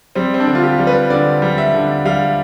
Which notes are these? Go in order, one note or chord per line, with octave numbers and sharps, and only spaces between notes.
G3 C4
C4
D4
D3
F4
G4
G3
B4
D3 D5
G3
E5
D3
G3 F5